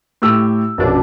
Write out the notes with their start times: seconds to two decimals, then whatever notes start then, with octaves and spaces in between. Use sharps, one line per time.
0.22 A2 G4 E6
0.78 A#1 F#2 B2 B3 D4